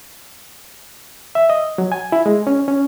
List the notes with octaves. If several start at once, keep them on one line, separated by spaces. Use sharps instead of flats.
E5
D#5
F#3
G#5
E4
G#3
C#4
C#4